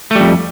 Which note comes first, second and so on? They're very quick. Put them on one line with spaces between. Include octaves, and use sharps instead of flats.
A3 G3 F2